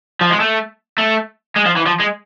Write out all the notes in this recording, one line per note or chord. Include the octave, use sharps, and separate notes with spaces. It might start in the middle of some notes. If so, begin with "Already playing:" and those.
F3
G#3
A3
A3
G#3
F3
E3
F3
G#3